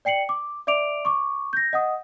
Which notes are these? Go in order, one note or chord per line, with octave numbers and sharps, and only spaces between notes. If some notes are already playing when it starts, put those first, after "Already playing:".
D5 G5 C7 C#7 F#7
D6
D5 E5 D6 D7 F7
C#6 D6
G6 A#6
D#5 F#5 D#6